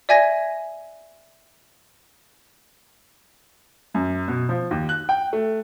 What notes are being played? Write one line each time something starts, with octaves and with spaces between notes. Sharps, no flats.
D5 E5 G#5 G#6 A#6
F#2
B2
F3
D#2
F#6
G5
A3